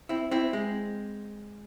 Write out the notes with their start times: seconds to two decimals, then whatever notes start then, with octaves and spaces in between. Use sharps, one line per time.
0.09 C4 E4
0.31 C4 E4
0.53 G#3 C4